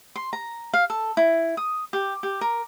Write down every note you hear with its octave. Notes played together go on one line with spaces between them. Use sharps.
C6
A#5
F5
A4
E4
D#6
G4
G4
A#4